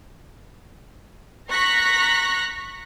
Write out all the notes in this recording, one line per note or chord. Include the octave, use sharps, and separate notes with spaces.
A#5 C#6 F#6 A#6 B6